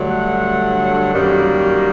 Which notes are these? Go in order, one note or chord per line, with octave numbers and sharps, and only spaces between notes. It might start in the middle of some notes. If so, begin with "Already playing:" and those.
Already playing: G2 D3 F#3 A3
F#5
F#2 D#3 G3 A#3